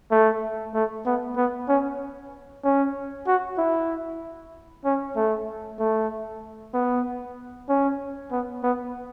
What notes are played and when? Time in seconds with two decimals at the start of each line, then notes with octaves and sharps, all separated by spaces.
0.11 A3
0.74 A3
1.06 B3
1.37 B3
1.69 C#4
2.64 C#4
3.27 F#4
3.58 E4
4.85 C#4
5.16 A3
5.79 A3
6.74 B3
7.69 C#4
8.32 B3
8.63 B3